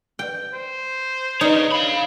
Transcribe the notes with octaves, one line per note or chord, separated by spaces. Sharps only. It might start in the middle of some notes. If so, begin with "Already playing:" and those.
G5
C5
D#4 G#4 C#5
F5 B5